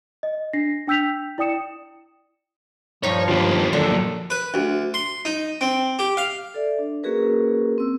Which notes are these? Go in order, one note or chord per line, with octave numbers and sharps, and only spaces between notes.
D#5
D4 A#6 C7
D4 G5 E6 G6 B6 F7
E4 D5 G5 D#6 C#7 E7
G2 F3 D#4 C#5
D#2 F4 G4 B4
D3 F3 F#3 A#3 A4
B4
D2
C6
D#4
C4
G4
F5
A4 D5 E5
D4
A#3 C#4 F#4 G#4 A#4 B4
C4 E6